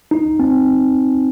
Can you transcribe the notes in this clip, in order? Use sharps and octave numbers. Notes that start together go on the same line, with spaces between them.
D#4
C4